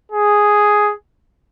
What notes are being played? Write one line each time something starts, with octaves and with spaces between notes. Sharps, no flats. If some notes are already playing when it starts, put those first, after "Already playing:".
G#4